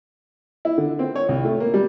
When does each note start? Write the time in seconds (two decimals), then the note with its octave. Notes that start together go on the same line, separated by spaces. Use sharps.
0.65 E4
0.78 D3
0.99 C4
1.16 C#5
1.29 C2
1.45 A3
1.60 A#3
1.74 G3